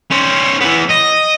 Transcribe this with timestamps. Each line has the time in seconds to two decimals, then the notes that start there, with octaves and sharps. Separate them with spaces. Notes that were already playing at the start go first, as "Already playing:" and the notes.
0.11 C#4 C5
0.61 E3 B3
0.89 D#5